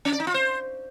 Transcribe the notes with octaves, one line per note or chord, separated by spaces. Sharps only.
C#4
D5
D#4
F4
C5